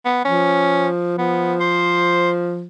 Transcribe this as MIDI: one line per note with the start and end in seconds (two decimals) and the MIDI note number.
0.05 0.22 59
0.25 1.15 53
0.25 0.88 61
1.18 2.67 53
1.18 1.54 59
1.60 2.30 72